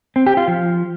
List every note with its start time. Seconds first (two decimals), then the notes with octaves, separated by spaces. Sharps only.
0.16 C4
0.27 G4
0.37 F4
0.48 F3